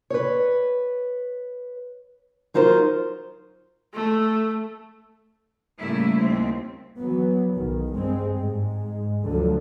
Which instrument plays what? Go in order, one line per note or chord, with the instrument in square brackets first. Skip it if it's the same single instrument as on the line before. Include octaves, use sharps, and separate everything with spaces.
[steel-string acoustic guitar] B4 C#5
F#3 D#4 F4 A#4 C5
[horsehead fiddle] A3
[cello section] A2 C#3 G3 A3 A#3 E4
D#2 C4
[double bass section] E3 F#3 B3
B1 D#3
G2 G#3 C4
G#2 G#3
D2 D3 F3 F#3